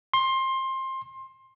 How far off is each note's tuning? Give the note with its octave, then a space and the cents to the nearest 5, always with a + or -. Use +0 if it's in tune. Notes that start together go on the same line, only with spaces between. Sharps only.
C6 +20